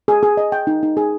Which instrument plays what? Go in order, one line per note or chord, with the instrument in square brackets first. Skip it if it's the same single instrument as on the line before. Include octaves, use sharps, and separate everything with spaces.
[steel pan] G#4
G#4
D#5
G5
D#4
D#4
G#4